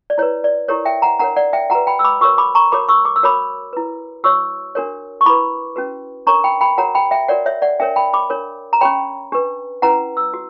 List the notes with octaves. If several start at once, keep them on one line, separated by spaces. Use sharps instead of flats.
D5
E4 B4 C#5
D5
E4 G4 A#4 C#5
E5 G5
F#5 A#5
D4 A#4 C#5 F#5 A#5
D5 F#5
E5 G5
F#4 F#5 A#5
B4
G5 B5
E6
B5 D6
F#4 A#4 C#5 C#6 E6
B5 D6
A#5 C#6
F#4 A#4 C#5 B5 D6
C#6 E6
D6
E6
F#4 A#4 C#5 B5 D6
E4 B4
F#4 C#5 C#6 E6
D4 F#4 A#4 C#5
C#6
E4 B4 B5 D6
C#4 F#4 B4
D4 A#4 C#5 A#5 C#6
G5 B5
G5 B5
F#4 A#4 C#5 F#5 A#5
G5 B5
E5 G5
F#4 A#4 C#5 D5 F#5
C#5 E5
D5 F#5
D4 A#4 C#5 E5 G5
G5 B5
B5 D6
D4 A#4 C#5
A#5
C#4 G4 C#5 G5 B5
D4 G4 B4
C#4 E4 B4 F#5 A#5
E6
F#4